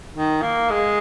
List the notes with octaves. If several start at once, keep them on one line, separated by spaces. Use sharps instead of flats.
D#3
A#3
G#3